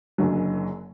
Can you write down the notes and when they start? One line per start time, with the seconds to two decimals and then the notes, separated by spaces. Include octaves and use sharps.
0.18 F#1 F#2 D3 F#3